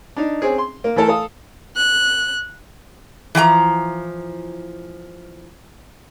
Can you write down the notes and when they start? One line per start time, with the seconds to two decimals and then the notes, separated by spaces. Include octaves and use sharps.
0.17 D4 D#4
0.42 C4 C#4 G#4
0.58 C6
0.84 A#3
0.96 E3 A3 A4 A#4
1.08 A4 F5 D#6
1.76 F#6
3.35 E3 F3 G5 A#5